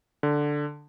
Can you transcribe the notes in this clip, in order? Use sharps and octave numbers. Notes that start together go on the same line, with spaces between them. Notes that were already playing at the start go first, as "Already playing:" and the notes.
D3